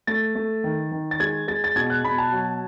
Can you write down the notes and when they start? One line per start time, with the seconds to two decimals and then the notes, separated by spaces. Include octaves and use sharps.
0.07 A3 A6
0.35 A3
0.64 D#3
0.92 D#3
1.11 A6
1.20 G#3 G#6
1.48 G#3 A6
1.64 A6
1.76 B2 G#6
1.90 F#6
2.04 B2 B5
2.18 A5
2.32 F#3